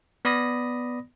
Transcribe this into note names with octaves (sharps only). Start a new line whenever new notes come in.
B3 D5 B5 D#6 A#6